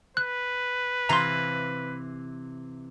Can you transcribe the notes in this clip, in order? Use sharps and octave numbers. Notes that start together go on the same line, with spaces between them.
B4 F#6
C3 E3 F5 A#5 C6